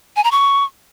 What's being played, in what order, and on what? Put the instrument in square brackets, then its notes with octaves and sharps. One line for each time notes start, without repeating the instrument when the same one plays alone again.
[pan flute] G#5
A#5
C#6